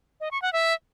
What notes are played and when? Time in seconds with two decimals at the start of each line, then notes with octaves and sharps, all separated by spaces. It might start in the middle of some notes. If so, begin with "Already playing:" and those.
0.20 D#5
0.31 C#6
0.42 F#5
0.53 E5